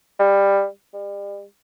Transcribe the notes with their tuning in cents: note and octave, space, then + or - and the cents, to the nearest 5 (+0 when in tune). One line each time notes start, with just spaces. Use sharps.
G3 +15
G3 +40